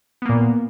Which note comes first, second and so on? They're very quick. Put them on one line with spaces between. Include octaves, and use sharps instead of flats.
B3 A#3 A#2